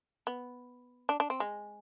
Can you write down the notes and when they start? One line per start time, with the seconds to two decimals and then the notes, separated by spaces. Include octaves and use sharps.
0.27 B3
1.09 D4
1.20 D4
1.30 C4
1.40 G#3